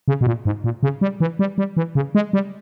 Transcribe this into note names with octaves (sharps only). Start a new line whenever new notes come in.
C#3
B2
A#2
G#2
A#2
C#3
G3
E3
G3
G3
E3
C#3
G#3
G3